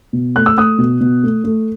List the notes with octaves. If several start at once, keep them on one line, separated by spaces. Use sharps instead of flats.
B2
A3 F#6
E6
A3 D#6 F#6
B2
B2
A3
A3